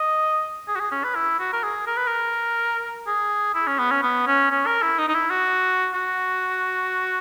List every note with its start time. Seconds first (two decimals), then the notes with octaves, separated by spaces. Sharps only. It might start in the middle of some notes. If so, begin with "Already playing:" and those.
Already playing: D#5
0.68 G#4
0.75 F#4
0.80 G#4
0.91 C#4
1.04 B4
1.15 E4
1.39 F#4
1.53 A#4
1.63 G#4
1.87 A#4
1.97 B4
2.07 A#4
3.07 G#4
3.54 E4
3.67 C#4
3.78 B3
3.91 C#4
4.03 B3
4.27 C#4
4.50 C#4
4.66 A#4
4.82 E4
4.98 D#4
5.08 D#4
5.14 E4
5.30 F#4
5.94 F#4